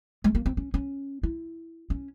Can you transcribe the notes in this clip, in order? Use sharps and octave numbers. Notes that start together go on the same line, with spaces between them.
G#3
A#3
C4
C#4
C#4
E4
C#4